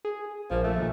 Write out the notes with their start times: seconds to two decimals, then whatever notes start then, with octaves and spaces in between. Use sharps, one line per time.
0.05 G#4
0.50 A#1 F3 A#3
0.63 A3
0.78 D#2 A#2